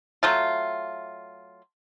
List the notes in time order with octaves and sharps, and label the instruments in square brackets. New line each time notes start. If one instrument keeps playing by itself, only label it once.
[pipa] F#3 A3 F4